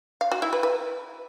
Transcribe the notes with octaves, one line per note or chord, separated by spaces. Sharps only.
F5
F#4
E4
B4
B4